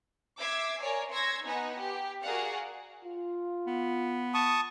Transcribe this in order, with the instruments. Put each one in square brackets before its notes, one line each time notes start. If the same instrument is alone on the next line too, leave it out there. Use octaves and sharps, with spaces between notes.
[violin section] E5 D6 E6 G#6 C7
A#4 C#5 D5 G#5
C6 C#6 E6 G#6 A#6
B3 D#4 B4 F#5 G#5
G4
F#4 G#4 A#4 D5 F5 F#5
[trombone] F4
[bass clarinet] B3
[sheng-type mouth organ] A5 C#6 D#6